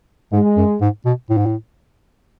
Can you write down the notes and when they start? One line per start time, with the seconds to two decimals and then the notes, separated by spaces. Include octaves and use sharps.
0.32 G#2 G#3
0.57 F#2
0.81 G#2
1.05 B2
1.30 A2
1.38 G#2
1.46 A2